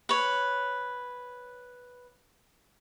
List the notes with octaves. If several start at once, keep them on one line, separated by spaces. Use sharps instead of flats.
B4 C#5